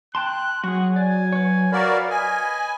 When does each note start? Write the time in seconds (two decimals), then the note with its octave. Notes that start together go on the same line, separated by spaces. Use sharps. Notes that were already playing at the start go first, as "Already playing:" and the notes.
0.15 G5 A5 C6 F#6
0.64 F#3 F#4 G#4 F#5
0.96 D5 G#5
1.33 B4 C#5
1.72 F#4 A#4 D5 F5 B5
2.10 D#5 G#5